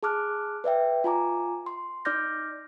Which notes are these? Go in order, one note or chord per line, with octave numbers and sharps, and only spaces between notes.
G#4 A5 D6 F6 F#6
B4 D5 E5 G5
F4 G#5 A#5 D6
C6
D#4 D5 D6 F6 G6 A#6